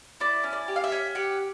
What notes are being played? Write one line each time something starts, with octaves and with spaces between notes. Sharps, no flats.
E4 D5
C#4
D5
G4
F5
E5
C#4
G4 F#5